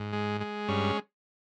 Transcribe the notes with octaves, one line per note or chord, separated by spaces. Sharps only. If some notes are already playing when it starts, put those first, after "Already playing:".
Already playing: G#2
G#3
G#3
G2 C#4